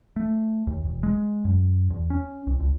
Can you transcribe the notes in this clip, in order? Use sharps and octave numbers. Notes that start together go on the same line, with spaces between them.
A3
D#2
E1
G#3
F#2
E2
C#4
C2
C#2